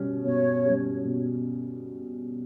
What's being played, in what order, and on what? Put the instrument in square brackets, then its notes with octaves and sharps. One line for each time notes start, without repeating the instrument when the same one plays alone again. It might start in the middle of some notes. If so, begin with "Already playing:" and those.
Already playing: [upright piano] B2 G3 C#4 G4
[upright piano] B2 [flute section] C#5
[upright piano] G3 C#4 G4
B2